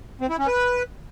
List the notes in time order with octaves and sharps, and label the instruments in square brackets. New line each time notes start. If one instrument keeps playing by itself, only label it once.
[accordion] C4
E4
C#4
B4